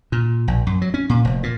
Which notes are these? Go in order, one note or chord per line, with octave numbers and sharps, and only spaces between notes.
A#2
A#1
F#2
F#3
C#4
A#2
F1
A#2